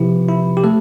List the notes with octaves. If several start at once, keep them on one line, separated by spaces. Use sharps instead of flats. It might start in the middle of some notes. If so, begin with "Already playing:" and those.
Already playing: C3 F3 E4 G4 B4
E4
G4
A3 A4